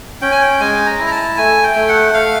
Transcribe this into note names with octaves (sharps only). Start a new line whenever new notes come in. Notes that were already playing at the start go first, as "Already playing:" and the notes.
C#4 G5
G#5
G5
G#3 G#5
A#5
E4
A#5
A5
A3 G#5
G5
A3
F#5
A3 F5